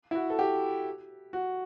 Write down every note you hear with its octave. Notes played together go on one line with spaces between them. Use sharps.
E4
F#4
A4
G4
F#4